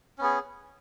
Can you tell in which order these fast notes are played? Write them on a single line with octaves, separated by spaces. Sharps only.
C#4 B3 G#4